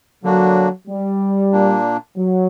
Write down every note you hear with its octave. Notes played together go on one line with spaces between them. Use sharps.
D3 F#3 A#3 D4 F#4
G3
A#2 A#3 D4
F#3